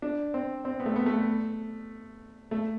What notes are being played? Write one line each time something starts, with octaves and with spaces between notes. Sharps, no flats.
D4
C4
C4
B3
A3
B3
A3
A3